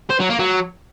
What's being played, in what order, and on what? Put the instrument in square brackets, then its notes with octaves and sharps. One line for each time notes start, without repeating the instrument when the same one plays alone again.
[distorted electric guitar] C5
F#3
A#3
F#3